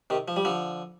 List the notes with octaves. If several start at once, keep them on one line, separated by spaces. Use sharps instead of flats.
C3 D#3
F3
G3
D3 F3